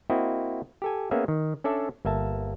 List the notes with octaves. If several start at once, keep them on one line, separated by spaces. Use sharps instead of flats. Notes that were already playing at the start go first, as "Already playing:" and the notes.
A#3 C4 E4 F#4 D#5
G4 A4 G#5
A#3 B3 C#4 G#4 E5
D#3
C#4 D4 A4 D5 E5 A5
G1 A#3 E5 A5